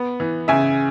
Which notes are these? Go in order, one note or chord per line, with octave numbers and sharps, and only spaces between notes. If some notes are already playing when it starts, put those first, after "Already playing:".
Already playing: B3
E3
C#3 E5 G#5